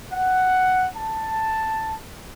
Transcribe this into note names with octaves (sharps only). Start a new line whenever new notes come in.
F#5
A5